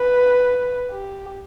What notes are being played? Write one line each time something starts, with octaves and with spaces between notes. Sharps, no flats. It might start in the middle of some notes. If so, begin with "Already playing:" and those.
Already playing: B4
G4